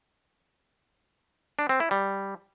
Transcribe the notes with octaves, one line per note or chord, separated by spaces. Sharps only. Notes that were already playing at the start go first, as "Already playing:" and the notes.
D4
C4
E4
G3